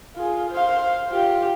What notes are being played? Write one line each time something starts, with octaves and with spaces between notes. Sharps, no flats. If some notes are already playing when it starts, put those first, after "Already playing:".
F4 G#4
C5 F5
F4 G4